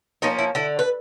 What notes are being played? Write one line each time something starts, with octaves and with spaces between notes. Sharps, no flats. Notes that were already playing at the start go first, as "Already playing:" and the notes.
F3 A#3 C#4 D#4
E4
D3 E4
B4